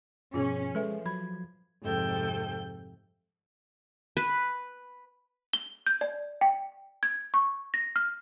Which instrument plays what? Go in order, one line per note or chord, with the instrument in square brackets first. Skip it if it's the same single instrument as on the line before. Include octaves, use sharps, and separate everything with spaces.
[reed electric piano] G2 B2 [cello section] F3 C#4 [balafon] F4 G#4
[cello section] F3 [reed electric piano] G#3 [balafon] A4 B4 E5
[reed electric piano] F#3 G#6 [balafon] B5
[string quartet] F2 G#2 C3 A4 G5 G6
[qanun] B4
[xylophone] G7
G6
D5
G5
G#6
C#6
A#6
F6